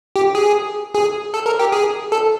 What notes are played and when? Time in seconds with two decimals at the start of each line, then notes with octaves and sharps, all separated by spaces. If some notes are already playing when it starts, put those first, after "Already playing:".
0.16 G4
0.35 G#4
0.94 G#4
1.34 A4
1.46 A#4
1.59 G4
1.72 G#4
2.12 A4